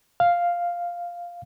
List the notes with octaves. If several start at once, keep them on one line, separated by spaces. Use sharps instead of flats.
F5